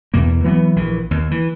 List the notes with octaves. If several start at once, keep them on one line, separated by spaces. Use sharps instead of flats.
E2 B2 A#3
E3 F#3 A3 B3
A#1 E3
D#2
E3